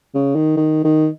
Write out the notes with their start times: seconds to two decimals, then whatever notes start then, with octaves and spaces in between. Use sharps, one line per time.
0.15 C#3
0.35 D#3
0.57 D#3
0.84 D#3